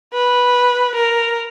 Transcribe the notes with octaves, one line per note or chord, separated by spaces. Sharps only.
B4
A#4